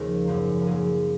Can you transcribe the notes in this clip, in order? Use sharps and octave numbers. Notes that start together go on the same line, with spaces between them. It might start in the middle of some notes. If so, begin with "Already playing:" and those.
Already playing: D#2 C#3 F3 A#3 A#4
G#1 F#2 F3 A#3
A#4
A#2 F#3 A#3 G#4